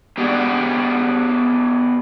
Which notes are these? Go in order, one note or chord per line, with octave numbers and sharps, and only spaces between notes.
B3 G4 G#4 D5 F#5